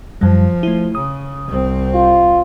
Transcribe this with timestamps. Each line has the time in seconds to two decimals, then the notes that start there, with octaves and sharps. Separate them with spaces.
0.21 F#2 F3 G3
0.63 A3 E4
0.95 C#3 D#6
1.48 C2 C4
1.94 F4